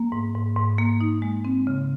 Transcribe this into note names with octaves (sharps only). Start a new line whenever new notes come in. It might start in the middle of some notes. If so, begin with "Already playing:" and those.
Already playing: A#3
G#2
G#2
G#2
A#3
D#4
G#3
C4
C#3